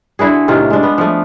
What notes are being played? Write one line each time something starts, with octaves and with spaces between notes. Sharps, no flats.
D3 E4 F#4 G#4
A2 C3 D#3 F4
G#3 D4
B3
F3 A3